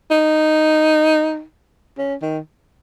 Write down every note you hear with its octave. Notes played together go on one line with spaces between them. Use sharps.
D#4
C#4
D#3